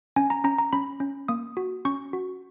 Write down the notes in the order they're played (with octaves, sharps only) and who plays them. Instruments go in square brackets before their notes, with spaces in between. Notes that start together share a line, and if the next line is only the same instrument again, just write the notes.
[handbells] C#4 G#5
A#5
C#4 A#5
A#5
C#4 B5
C#4
A#3 D#6
F#4
C#4 C#6
F#4